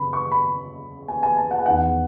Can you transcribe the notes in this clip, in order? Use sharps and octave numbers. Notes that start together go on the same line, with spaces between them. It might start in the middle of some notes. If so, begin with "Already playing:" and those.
Already playing: F#2 C#3 B5
C#6
B5
G#5
G#5
A5
F#5
G#5
E2 D#3 F#5